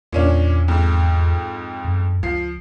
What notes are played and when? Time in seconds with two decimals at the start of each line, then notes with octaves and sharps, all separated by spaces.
0.13 E2 A#2 C#4 D4
0.68 F2 G#2
1.84 F#2
2.23 C#2 F3 C7